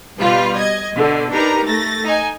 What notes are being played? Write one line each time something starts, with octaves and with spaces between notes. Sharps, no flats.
B2 G3 F4 B4
D#5 G#6
B2 D3
D4 D#4 G4 A#4 B4 A#5
A3 A6 A#6
D#4 G#5